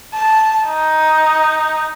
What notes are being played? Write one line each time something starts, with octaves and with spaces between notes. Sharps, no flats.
A5
D#4